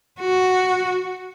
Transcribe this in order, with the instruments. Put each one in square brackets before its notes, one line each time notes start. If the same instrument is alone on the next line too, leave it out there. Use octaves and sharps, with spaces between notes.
[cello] F#4